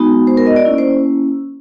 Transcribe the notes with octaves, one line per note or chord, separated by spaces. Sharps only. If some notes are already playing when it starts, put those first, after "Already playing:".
Already playing: G#3 B3 D#4 F#4
C5
A#4
D#5
D5
A#3 C#4 E4
C5